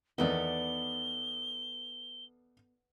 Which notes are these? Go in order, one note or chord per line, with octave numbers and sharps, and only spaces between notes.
E2 D#3 B3 D#4 A4 D5 G7